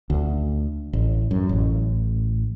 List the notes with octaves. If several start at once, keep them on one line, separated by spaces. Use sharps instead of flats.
D2
A1
F#2
A1